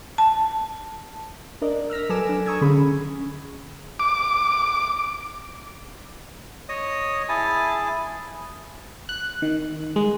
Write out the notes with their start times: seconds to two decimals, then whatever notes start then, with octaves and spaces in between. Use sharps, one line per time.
0.18 A5
1.61 D4 A#4 D5 D#5
1.90 E6 F6 A#6 B6
2.09 F#3 A4 B4 G#5 D6 E7
2.29 D4
2.46 A#5 C#6 D#6 E6 G#6
2.61 D3 C#4 G#4 B5
4.00 D6
6.69 C#5 D#5 D#6
7.29 E4 G#4 G#5 A5
9.09 F#6
9.42 D#3
9.96 G#3